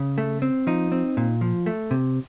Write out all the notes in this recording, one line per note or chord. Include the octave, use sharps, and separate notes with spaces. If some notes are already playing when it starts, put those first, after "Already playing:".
Already playing: C#3
A3
C4
F3 D#4
C4
A#2
F3
A3
C3